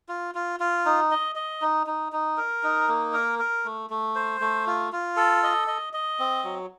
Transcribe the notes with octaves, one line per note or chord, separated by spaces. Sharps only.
F4
F4
F4
D#4
D#5
D#5
D#4
D#4
D#4
A#4
D#4
A#3
A#4
A#4
A3
A3
C5
A3
F4
F4
A4
D#5
D#5
D#5
C4
F#3